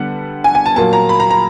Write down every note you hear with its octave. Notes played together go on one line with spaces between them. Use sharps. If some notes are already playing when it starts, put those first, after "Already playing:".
Already playing: D3 G3 B3 F#5
G#5
G#5
A5
A#2 F#3 A#3 A5
A#5
B5
A#5
A#5